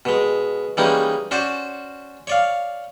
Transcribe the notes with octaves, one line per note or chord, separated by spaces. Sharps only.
B2 G#3
E3 G3 G#3 A#3 C#4 D#4
C#4 F#4 C5 D5
C#5 D5 F5